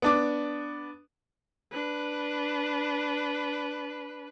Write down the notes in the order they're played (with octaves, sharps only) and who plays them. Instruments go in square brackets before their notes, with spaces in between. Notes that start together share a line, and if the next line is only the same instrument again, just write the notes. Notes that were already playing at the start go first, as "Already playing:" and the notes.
[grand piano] B3 D4 D6
[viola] D4 B4